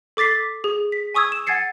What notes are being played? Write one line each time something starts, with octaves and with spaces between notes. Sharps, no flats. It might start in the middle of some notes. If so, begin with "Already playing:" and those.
A4 D6 A6 B6 C7
G#4
B6
G#5 C#6 D#6 E6 G#6
E7
F#5 G#5 G#6 A6 C7 C#7